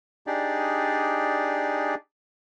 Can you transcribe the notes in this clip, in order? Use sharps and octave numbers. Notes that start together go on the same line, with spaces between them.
D4 D#4 G4 G#4 D5